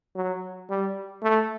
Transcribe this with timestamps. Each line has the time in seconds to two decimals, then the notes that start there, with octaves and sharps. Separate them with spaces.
0.15 F#3
0.70 G3
1.23 A3